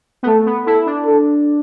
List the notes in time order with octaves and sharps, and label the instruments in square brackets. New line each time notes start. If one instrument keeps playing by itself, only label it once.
[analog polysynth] B3
[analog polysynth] A3 [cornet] A4
[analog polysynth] B3
[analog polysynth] E4 [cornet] A4
[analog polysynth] D4
[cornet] A4